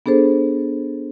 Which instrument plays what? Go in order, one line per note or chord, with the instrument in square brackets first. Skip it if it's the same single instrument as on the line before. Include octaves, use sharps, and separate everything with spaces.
[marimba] B3 D4 G#4 A4 C5